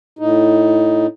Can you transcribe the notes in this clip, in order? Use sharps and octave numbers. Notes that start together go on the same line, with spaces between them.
A2 D#4